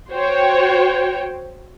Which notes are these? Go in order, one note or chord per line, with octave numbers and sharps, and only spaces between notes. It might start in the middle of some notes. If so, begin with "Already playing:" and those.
F#4 C5 C#5 G5